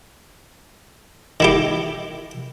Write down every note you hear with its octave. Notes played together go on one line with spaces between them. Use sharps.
D#3 E4 G4